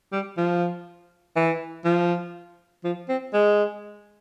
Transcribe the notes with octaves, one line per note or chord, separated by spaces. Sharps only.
G3
F3
E3
F3
F3
C4
G#3